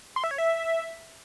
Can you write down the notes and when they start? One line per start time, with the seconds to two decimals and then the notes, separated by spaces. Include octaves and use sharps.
0.16 C6
0.24 E5
0.31 C#5
0.38 E5